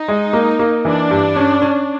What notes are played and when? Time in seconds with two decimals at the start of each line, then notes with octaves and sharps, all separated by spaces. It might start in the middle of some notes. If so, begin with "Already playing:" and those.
Already playing: D#4
0.08 G#3
0.33 A#3
0.59 A#3
0.85 E3 D4
1.11 G2
1.36 C#4
1.62 C#4